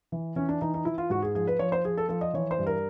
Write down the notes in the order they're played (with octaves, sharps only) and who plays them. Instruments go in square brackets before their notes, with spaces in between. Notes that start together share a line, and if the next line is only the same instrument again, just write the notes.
[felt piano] E3
E3 C#4
D4
E3 D#4
D#4
E3 E4
F4
G#2 F#4
G#4
F3 G#4
B4
F3 C#5
C5
F3 G#4
A4
F3 A4
D#5
E3 C#5
C5
G2
A#4